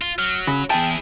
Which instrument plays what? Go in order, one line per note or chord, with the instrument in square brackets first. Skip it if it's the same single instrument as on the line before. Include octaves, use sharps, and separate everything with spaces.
[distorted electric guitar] F4
[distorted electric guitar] F#3 [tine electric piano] F6
[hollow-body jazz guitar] C#3 [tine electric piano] B5
[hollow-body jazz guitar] E2 A5 [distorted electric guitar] E4 G#4 [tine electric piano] G5